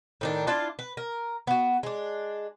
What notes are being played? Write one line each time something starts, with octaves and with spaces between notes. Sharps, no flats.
A2 D#3 D4
D4 E4 F4 A5
B4
A#4
B3 F#4
G#3 D4